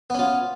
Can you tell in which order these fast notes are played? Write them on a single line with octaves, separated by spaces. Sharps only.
B3 C#4 F4